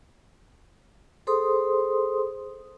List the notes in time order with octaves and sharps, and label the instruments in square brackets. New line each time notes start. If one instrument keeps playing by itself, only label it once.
[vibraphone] G#4 A4 C5 C6 D#6